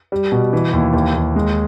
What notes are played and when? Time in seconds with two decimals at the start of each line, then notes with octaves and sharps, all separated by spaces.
0.12 G3
0.32 B2
0.53 E3
0.73 D#2
0.93 D#2
1.14 D#2
1.36 G#3